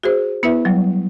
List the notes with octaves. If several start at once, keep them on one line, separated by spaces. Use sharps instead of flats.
F#4 G#4 C5
B3 E4 B4 E5
F#3 G3